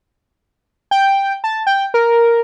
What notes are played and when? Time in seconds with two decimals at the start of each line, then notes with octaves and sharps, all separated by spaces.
0.91 G5
1.44 A5
1.67 G5
1.94 A#4